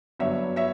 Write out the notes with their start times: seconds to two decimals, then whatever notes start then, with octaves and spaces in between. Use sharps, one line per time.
0.19 G1 G2 F#3 C#5 E5
0.56 C#5 E5